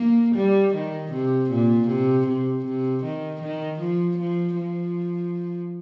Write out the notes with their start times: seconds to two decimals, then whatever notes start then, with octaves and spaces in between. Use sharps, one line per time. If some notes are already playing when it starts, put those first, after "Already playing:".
Already playing: A#3
0.35 G3
0.74 D#3
1.12 C3
1.50 A#2
1.88 C3
2.27 C3
2.65 C3
3.03 D#3
3.42 D#3
3.79 F3
4.17 F3
4.56 F3